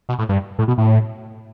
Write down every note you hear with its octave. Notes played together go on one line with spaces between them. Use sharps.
B2
A2
G2
A2
B2
A2